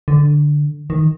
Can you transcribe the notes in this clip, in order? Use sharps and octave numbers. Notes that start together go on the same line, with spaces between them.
D3
D#3